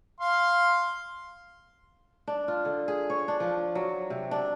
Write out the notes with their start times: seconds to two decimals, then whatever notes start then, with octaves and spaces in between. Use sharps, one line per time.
0.20 F5 C6
2.27 D4
2.48 F4
2.65 D3
2.88 G#4
3.10 C#5
3.28 D4
3.40 F3
3.75 F#3
4.10 C3
4.31 D4